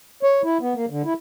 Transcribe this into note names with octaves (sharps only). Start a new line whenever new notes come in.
C#5
E4
B3
A#3
D3
E4